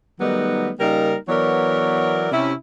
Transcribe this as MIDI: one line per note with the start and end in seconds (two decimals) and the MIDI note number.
0.20 0.70 51
0.20 0.70 54
0.20 0.70 55
0.20 0.70 57
0.20 0.70 59
0.20 0.70 63
0.80 1.15 49
0.80 1.15 55
0.80 1.15 58
0.80 1.15 63
0.80 1.15 70
1.29 2.27 52
1.29 2.27 54
1.29 2.27 59
1.29 2.27 70
1.29 2.27 73
1.29 2.27 74
2.32 2.52 48
2.32 2.52 61
2.32 2.52 64